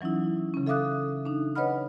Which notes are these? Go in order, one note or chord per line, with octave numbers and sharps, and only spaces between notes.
E3 F#3 C#4 D#4 E4
C#3 C#4
A4 E5 F5 D6 D#6 F#6
D4 D#4
B4 C#5 D#5 F#5 B5 F6